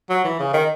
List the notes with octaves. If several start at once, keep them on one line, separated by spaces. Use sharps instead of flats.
F#3
E3
C#3
D#3